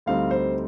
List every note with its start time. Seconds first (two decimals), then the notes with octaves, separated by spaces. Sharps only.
0.06 D2 D3 G3 C4 D#4 F5
0.31 C5